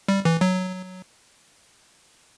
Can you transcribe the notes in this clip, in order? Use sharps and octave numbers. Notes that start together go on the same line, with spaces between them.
G3
E3
F#3